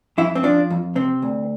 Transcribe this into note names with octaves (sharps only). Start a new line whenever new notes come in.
F2 E4
C4
F3 D4
F2
C3 C4
D2